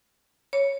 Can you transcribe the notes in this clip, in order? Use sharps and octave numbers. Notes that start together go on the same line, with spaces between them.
C#5